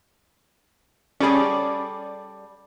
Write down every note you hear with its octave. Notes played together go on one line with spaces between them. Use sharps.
G3 C#4 G#4 A4 D5